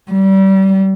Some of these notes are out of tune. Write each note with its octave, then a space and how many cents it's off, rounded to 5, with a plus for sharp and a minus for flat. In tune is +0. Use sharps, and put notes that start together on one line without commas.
G3 -30